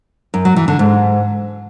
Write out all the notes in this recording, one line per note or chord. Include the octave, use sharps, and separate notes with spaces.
F#2
F#3
E3
D3
G#2